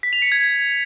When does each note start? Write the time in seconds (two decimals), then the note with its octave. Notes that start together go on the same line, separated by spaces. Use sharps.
0.03 B6
0.13 F7
0.22 C#7
0.32 G#6